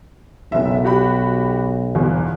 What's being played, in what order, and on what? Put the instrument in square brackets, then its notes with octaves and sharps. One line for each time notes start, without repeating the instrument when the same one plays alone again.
[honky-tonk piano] F#1 E5 [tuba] B1
[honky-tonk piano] F#4 G4 B5
G1 E2